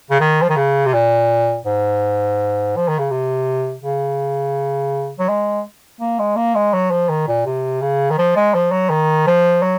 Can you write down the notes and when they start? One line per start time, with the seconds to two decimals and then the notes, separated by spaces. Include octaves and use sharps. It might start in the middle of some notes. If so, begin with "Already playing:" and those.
0.10 C#3
0.20 D#3
0.42 F3
0.49 D#3
0.56 C#3
0.86 C3
0.94 A#2
1.66 G#2
2.77 F3
2.88 D#3
2.99 C#3
3.11 C3
3.82 C#3
5.19 F#3
5.28 G#3
6.00 A#3
6.19 G#3
6.36 A#3
6.55 G#3
6.73 F#3
6.91 F3
7.09 D#3
7.28 A#2
7.46 C3
7.81 C#3
8.10 D#3
8.18 F3
8.36 G#3
8.54 F3
8.72 F#3
8.90 D#3
9.27 F3
9.62 F#3